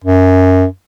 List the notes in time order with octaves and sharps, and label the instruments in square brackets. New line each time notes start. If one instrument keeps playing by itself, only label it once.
[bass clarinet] F#2